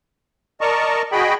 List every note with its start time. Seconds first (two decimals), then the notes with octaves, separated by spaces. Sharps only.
0.61 A#4 D5 D#5 A5 A#5 C#6
1.12 F#4 G#4 D#5 G5 B5